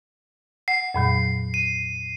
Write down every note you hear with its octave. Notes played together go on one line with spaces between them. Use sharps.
F#5 C7
F2 A#2 F#3
D#7